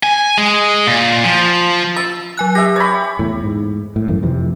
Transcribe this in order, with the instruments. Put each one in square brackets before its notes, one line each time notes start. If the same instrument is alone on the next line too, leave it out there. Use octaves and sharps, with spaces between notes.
[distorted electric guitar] G#5
G#3
A#2
F3
[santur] E6 [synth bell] A6
[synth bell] F#3 G#5 F#6
[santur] G4 E5 [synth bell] A#6
[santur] C#5 B5
[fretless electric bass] E2 A2
G#2
A2
G#1 F#2 E3 A3
F2 C3 E3